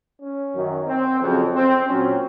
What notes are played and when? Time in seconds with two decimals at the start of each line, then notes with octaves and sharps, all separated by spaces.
0.20 C#4
0.54 F#2 D#3 F#3
0.87 C4
1.20 F2 C#3 F#3 C4
1.54 C4
1.86 A#2 F#3 C4 C#4